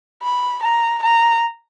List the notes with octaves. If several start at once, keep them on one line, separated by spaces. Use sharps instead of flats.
B5
A#5
A#5